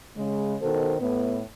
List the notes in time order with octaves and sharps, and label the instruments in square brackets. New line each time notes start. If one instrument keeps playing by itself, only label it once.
[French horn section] C#3 G#3
B2 D#3 A4 C5
A2 B3